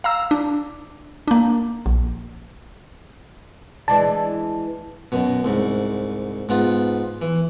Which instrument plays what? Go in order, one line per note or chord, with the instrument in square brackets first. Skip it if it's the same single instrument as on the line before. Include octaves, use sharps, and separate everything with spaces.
[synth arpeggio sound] F5 A#5 E6
D4
A#3 D4
A#1
[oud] E3 G#3 D4 [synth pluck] A5
[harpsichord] F#2 B2
C2 G#2
G#2 B3 F4
E3